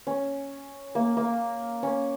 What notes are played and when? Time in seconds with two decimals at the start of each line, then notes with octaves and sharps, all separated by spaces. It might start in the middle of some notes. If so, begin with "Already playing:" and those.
0.07 C#4
0.95 A#3
1.17 A#3
1.83 C#4